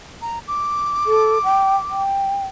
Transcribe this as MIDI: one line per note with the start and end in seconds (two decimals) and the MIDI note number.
0.22 0.39 82
0.48 2.02 86
1.06 1.38 69
1.44 1.76 79
1.90 2.46 79